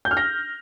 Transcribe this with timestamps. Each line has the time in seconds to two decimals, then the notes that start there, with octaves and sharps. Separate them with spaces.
0.05 G6
0.11 F6
0.17 A#6